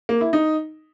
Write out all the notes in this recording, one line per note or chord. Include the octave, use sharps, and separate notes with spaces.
A#3
E4
D#4